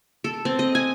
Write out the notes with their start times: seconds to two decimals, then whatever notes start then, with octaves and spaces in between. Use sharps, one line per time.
0.24 A4
0.45 C4
0.59 D#5
0.75 G#5